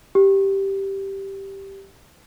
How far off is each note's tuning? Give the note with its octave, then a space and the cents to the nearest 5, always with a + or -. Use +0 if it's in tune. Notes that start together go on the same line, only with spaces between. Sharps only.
G4 -5